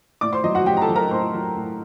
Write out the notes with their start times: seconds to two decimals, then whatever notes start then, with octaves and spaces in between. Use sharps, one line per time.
0.21 A2 D5 D6
0.33 C5 C6
0.44 F#3 D#5
0.55 F#4 F#5
0.66 A2 G4 G5
0.77 A#5
0.81 A4 A5
0.89 F#3
0.96 A#4 A#5
1.11 A2 C5 C6
1.33 F#3
1.56 A2